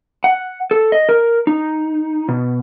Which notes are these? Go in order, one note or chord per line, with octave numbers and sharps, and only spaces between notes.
F#5
A4
D#5
A#4
D#4
B2